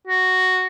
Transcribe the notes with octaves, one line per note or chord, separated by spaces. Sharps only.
F#4